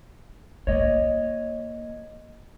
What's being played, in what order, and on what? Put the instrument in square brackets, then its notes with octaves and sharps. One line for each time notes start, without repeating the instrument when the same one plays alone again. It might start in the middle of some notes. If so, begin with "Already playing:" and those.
[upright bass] A#3 [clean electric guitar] C#5 D#5